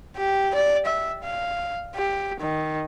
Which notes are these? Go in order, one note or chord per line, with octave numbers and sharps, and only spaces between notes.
G4
D5
E5
F5
G4
D#3